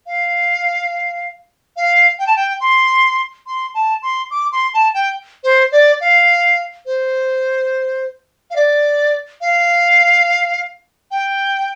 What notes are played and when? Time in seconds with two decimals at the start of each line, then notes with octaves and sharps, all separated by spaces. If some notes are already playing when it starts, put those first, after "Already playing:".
0.07 F5
1.77 F5
2.19 G5
2.27 A5
2.36 G5
2.61 C6
3.47 C6
3.74 A5
4.02 C6
4.31 D6
4.52 C6
4.74 A5
4.94 G5
5.44 C5
5.72 D5
6.01 F5
6.86 C5
8.51 F5
8.56 D5
9.41 F5
11.11 G5